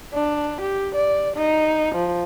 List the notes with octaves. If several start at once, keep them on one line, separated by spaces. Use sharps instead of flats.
D4
G4
D5
D#4
F3